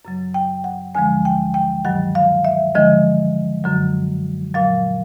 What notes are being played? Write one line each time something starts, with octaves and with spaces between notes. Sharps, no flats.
F#2 C#3 F#3
G5
F#5
D2 D3 F3 G#3 G#5
G5
G5
G2 D#3 F#3 F#5
F5
E5
D#2 D3 F3 G#3 D#5
F#2 D3 F#3
A#2 F#3 F5